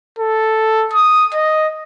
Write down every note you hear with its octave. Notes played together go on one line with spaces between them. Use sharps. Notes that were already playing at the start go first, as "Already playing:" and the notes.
A4
D#6
D#5